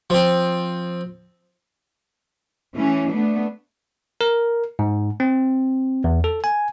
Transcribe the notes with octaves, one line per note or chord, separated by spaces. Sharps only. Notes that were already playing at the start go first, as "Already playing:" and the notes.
F3 C4
E3 A3 C#4
A3 B3 D4
A#4
G#2
C4
E2
A4
G#5